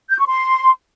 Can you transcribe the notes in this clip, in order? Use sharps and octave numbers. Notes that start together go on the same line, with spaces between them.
G6
C#6
C6